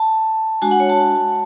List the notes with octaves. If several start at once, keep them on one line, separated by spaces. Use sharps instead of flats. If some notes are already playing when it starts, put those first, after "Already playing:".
Already playing: A5
G#3 D4 F#4 G#5
F#5
C#5
A5